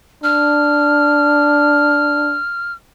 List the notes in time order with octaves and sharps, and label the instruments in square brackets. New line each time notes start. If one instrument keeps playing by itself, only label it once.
[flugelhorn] D4 [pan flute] F6